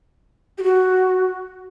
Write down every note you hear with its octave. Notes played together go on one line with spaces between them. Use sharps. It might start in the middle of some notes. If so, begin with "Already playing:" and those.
G4
F#4